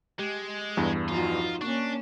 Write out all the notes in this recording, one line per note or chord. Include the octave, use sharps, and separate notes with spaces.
G#3 G4 E7
E2 G2
F3 D#4 F4 F#4
A#3 C#4 D4 C#6